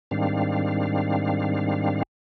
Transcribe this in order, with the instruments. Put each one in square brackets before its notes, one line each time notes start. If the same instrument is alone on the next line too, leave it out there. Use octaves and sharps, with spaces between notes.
[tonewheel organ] G#2 D#3 G3 C4 D4 F5